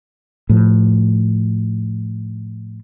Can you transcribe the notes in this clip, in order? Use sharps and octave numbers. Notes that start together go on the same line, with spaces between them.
A2 F3